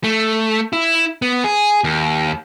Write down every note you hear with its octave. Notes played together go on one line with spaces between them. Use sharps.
A3
E4
B3
G#4
D#2